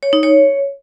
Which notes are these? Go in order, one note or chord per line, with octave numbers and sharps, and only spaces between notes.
C#5
D#4
C#5